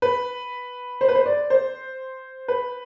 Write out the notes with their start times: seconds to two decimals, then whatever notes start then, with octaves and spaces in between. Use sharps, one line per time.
0.02 B4
1.01 C5
1.08 B4
1.15 C5
1.26 D5
1.50 C5
2.48 B4